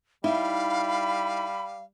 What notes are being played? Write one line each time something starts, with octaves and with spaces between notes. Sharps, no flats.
G3 D#4 E4 F5 B5